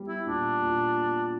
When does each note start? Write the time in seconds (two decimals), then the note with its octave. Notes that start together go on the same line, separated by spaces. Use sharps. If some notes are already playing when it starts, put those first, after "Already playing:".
Already playing: G3 B3
0.08 E4
0.26 A#2 D4
0.62 A#2
0.98 B3